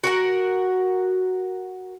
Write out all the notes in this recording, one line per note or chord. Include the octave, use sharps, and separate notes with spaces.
F#4 A#4 F#5